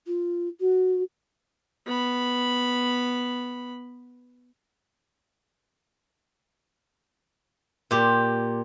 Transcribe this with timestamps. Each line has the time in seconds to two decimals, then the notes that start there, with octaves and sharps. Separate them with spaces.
0.06 F4
0.60 F#4
1.87 B3 B5
7.91 A#2 G4